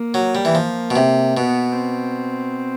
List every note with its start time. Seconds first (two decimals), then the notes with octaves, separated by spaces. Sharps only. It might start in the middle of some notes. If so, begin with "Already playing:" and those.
Already playing: A#3
0.14 F#3
0.35 G3
0.45 E3
0.55 F3 A#3
0.91 B2
0.96 C3
1.37 B2 B3
1.78 C4